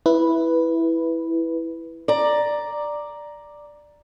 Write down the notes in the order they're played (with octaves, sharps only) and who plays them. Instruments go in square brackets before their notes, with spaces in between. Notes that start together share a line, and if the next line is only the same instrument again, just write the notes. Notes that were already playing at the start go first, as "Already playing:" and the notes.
[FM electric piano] E4 B4
[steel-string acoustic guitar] D5 A#5